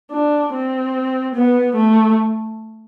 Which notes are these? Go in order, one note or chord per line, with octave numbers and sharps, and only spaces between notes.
D4
C4
B3
A3